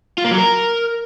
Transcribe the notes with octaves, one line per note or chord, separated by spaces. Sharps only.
F4
A#3
F#3
A#4